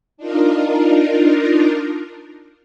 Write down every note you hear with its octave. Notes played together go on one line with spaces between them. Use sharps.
D4 D#4 F4 A#4